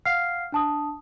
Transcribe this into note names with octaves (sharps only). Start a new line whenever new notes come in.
F5 F#5 F6 C7
D4 A5 D#6